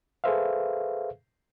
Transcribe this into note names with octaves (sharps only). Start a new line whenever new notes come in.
G#4 A4 B4 C5 E5 F5